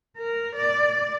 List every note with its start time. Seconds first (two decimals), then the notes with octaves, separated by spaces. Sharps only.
0.17 A#4
0.56 D5